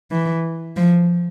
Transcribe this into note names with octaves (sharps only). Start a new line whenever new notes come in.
E3
F3